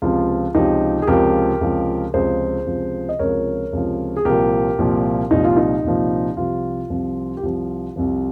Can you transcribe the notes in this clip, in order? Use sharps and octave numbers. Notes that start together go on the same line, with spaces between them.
C#2 C3 F3 F4
C#2 C3 F3 D#4 G4
G#4
C#2 C3 F3 G4 A#4
C#2 C3 F3
C#2 C3 F3 G#4 C5
C#2 C3 F3
D#5
C#2 C3 F3 A#4 C#5
C#2 C3 F3
G#4
C2 A#2 F3 G4 A#4
C2 A#2 F3
C2 A#2 F3 D#4
F4
D#4
C2 A#2 F3
C2 C3 F3 F4
C2 C3 F3
G4
C2 C3 F3 F4
C2 C3 F3